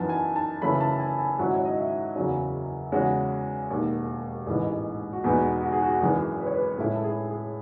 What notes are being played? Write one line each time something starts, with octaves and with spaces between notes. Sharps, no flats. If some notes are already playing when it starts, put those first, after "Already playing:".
Already playing: F#2 E3 B3 D#4 A5
G#5
A5
F#2 C#3 E3 A3 C#4 B5
A5
G#5
G#5
G#2 D#3 F#3 C#4 E4 F#5
C#5
D#5
E5
F#1 E2 C#3 F#3 C#4
E2 C#3 G#3 C#4 F#4
E1 D#2 D#3
A1 G#2 E3 G#4
F#4
E2 B2 G#3 B3 D#4 G#4
F#4
G#4
F#4
G#1 F#2 E3 G#3 G#4
B4
C#5
B4
A2 G#3 C#4 E4 A4
A4
G#4
G#4